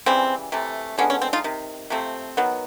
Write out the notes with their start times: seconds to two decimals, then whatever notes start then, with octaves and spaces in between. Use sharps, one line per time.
0.06 C#3 E3 G3 C4
0.52 C3 E3 A3
0.98 D3 F3 G#3 B3 C#4
1.10 C#4
1.22 C4
1.33 D#4 F4
1.44 C3 D#3
1.90 C3 F3 A3 C4
2.37 D#3 F#3 B3